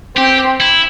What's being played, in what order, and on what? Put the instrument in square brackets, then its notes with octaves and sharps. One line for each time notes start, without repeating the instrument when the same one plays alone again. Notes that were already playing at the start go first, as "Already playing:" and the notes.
[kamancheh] C4 [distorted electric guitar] G4
[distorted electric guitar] E4